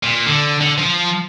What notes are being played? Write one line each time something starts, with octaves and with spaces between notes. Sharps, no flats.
A#2
D3
D3
F3